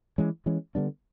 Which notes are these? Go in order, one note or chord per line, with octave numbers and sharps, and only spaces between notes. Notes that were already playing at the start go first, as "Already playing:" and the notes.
E3 G#3 C#4
E3 G#3 C#4
D3 G3 B3 D4